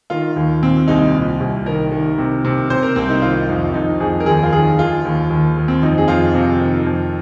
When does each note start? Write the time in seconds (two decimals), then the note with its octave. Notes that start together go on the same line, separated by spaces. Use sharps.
0.10 D#3 F4
0.36 D#2
0.62 A#2 C4
0.88 C2 D#4
1.14 A#2
1.40 C2
1.66 D#3 A#4
1.92 D#3
2.18 C3
2.44 C3
2.70 C3 C5
2.83 A#4
2.96 C2 C4
3.09 D#4
3.22 D#3 F4
3.49 F2 D#4
3.74 F2 D#4
4.00 F2 G#4
4.20 A#4
4.26 D#2 G#4
4.43 F4
4.52 D#3 G#4
4.79 D#3 F4
5.05 D#2
5.30 D#2
5.57 D#2
5.68 C4
5.83 F2 D#4
5.98 G#4
6.08 F2 F4
6.34 C3
6.61 D#3
6.86 F2